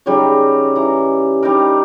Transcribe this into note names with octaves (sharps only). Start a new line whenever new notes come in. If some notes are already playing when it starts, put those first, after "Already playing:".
C#3 F#3 G3 D#4
E3 A#5
G3 D4 D#4 A#4